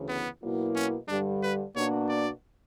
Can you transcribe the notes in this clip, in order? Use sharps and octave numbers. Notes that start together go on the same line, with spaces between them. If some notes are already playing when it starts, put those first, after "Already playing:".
Already playing: D2 C#3 E3
B3
B2 F#3 A#3 E4
C#4
G2 D3 G3 D4
B4
B2 A#3 D4 F#4 C#5
D5